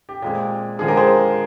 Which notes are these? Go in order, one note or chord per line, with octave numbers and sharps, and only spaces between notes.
G4
A#2 G#3 C4 G4
D3 F3 G#3 G#4
G4 A#4
G#4 C5